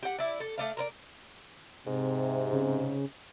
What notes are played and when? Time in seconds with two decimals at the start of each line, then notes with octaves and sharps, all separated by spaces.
0.03 G4 F#5
0.18 E4 D5
0.40 A4
0.58 A3 D5 F5
0.77 A#4 B4 D5
1.87 G#2 C3
2.53 C#3